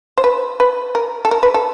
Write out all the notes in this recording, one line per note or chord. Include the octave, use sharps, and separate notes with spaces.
C5
B4
B4
A#4
A4
A#4
B4
A4